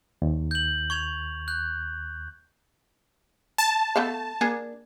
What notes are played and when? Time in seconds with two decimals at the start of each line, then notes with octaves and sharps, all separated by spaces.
0.22 D#2
0.51 G6 F#7
0.90 C#6 G#6 F7
1.48 F#6 G6
3.58 A5
3.96 A3 B3 F5
4.41 A#3 D4 G#4